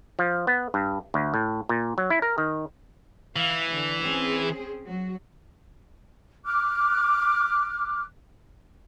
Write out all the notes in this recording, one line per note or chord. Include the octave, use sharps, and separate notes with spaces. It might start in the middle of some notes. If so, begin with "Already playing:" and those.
F3
B3
G2
D2
A2
A#2
F#3
E4
A#4
D#3
E3 F5
D3
C4 C#4 G#4
F#3 F#4
D6 F6 F#6